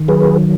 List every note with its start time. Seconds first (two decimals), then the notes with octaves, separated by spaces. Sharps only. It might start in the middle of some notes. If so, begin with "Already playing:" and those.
Already playing: D#3
0.08 F#3 G#4 B4